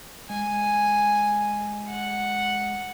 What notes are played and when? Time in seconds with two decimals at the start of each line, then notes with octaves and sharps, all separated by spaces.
0.30 G#3 G#5
1.89 F#5